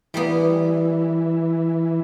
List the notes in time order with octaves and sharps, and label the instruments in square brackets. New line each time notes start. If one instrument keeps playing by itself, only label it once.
[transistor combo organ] E3 [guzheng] G3 A#3 B3